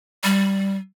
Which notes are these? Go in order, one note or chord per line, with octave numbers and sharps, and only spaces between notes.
G3